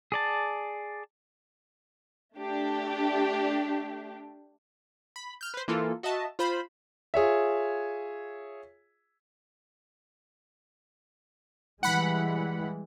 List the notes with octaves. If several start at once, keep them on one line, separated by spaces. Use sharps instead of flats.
G#4 D5 A5
A3 D4 G4
B5
F6 G6
B4 C5
E3 A#3 F4 A4
F#4 D#5 E5 A5
F4 C5 B5
F4 G#4 C#5 E5
E3 G3 G#3 F#5 B5